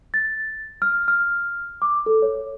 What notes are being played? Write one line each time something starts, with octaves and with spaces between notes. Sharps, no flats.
A6
F6
F6
D6
A4
C#5